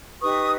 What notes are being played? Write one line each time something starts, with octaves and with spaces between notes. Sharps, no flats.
D#4 G4 B4 C#6 D#6